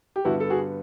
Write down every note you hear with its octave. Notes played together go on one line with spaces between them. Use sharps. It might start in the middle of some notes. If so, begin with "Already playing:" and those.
G4
G2 D3 G3 B3 E4 F#4
A4
F#4 G#4